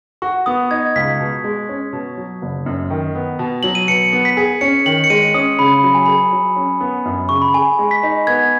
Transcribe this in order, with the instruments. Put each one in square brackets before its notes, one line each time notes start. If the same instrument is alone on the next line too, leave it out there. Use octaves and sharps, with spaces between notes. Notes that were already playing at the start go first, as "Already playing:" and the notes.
[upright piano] F#4 [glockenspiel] C#6
[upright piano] B3 [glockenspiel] D#6
[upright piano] D#4 [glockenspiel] G#6
[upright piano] C#2 [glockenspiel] B6
[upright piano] B2
G#3
C#4
B2
F#3
F#1
F#2
D#3
B3
B2
[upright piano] F#3 [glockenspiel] F#7
[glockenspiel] D#7
[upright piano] B2 [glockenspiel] C#7
[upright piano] B3
[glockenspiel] B6
[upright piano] G#4
[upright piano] C#4 [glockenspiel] C#7
[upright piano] D#3 [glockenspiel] F#7
[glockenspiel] C#7
[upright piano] G#3 [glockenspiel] D#7
[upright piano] C#4 [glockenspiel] D#6
[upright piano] C#3 [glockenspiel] B5
[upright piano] F#3 [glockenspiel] B5
[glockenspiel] G#5
[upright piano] G#4 [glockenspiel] B5
[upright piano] F#3
C#4
B3
F#2
[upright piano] C#3 [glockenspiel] C#6
[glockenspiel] B5
[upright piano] G#4 [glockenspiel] G#5
[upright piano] G#3
[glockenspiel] B6
[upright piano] D#4
[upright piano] B3 [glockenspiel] G#6